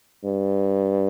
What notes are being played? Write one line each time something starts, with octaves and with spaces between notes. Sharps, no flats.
G2